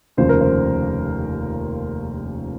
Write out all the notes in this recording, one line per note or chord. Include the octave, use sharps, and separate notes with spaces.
F1 D#2 C#3 F3 C5
A#4
C5